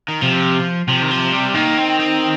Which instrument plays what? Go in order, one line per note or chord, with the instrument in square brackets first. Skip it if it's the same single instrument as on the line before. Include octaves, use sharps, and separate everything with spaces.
[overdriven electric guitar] D#3
[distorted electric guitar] C3 [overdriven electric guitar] F3
[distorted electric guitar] C3 [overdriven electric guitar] F3
[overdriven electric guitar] D#3
F3
G3
[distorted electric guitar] D#3 [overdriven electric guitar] A#3
[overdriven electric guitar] C4
C4